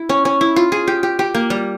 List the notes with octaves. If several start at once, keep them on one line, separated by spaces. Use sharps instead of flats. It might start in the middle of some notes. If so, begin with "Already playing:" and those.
Already playing: E4
C#4
C#4
E4
F4
G#4
G4
G4
G4
A#3
G3